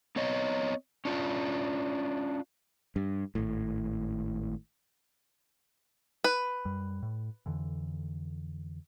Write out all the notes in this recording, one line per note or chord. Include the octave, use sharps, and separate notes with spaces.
B3 C4 C#5 D#5
C#4 D4 F4
G2
G#1 A2
B4
F#2 G3
A2
F2 D3 E3